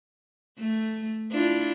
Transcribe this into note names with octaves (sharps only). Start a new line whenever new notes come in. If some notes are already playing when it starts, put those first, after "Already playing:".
A3
D4 E4 F4